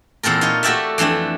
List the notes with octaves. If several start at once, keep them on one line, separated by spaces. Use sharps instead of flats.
E2 A#2 C4 A4 A#4
D#4 F4 C#5
A3 F#4 G4 A4 D5 E5
F2 E3 A3 D4 G4